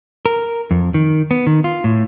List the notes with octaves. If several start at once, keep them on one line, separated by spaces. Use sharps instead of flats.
A#4
F2
D#3
B3
D#3
F4
A2